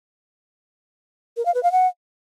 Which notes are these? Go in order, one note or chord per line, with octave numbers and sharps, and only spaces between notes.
A#4
F5
B4
F5
F#5